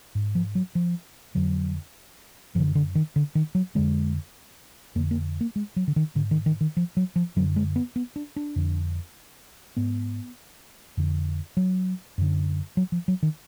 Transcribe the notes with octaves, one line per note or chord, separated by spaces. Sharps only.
G#2
F3
F#3
F3
F2 D3 F#3
F#2 D3 F3
D3
D#3
D3
D#3
F#3
F2 D3 G#3
F2 D3 A#3
A#3
A#3
G#3
F#3
D3
D#3
G#2 D3
D#3
D#3
D#3
F3
F#3
F3
F#2 D3 F#3
G#3
B3
B3
D4
D4
F2 D3
G#2 B3
F2 D3
F#3
F#2 D3
F#3
F3
F#3
D#3